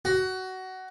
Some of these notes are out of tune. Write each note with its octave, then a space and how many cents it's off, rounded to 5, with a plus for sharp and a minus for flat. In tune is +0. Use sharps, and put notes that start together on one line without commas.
F#4 +20